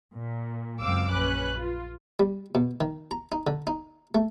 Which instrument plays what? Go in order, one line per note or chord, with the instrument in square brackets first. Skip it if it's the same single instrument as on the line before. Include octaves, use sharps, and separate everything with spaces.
[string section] A#2
C#2 F#2 C4 F5 D6 E6
A#1 C#4 B4 F#6
F4
[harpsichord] G3
B2
D#3
A#5
D#4
D3
D#4
A3